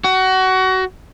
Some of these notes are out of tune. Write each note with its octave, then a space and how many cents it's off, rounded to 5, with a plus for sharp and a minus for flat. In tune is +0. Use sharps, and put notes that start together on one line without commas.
F#4 +25